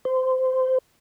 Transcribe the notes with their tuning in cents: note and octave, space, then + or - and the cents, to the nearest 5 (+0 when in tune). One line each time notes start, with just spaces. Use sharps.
C5 -20